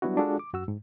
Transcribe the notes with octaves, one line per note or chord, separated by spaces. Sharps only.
F#3 G3 B3 D4 E4 F#4
G#3 D4 F4 F#4 G#4 A4
D6
F#2 F#4 E6
G#2